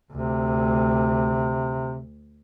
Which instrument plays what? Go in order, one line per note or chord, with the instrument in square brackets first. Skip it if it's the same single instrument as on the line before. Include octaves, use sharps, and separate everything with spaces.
[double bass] D2 [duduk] C3